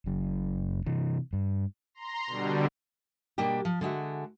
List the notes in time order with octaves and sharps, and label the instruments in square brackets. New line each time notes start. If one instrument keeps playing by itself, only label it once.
[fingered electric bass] F#1 F#2
C3 E3
G2
[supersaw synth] A#5 C6
B2 D3 G3
[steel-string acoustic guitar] B2 G3 A#3 D4 G4
F3
D3 G#3 F#4 E5